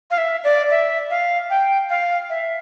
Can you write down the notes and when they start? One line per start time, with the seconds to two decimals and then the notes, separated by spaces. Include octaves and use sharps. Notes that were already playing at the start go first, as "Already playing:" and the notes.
0.11 F5
0.18 E5
0.44 D5
0.70 E5
1.10 F5
1.50 G5
1.90 F5
2.30 E5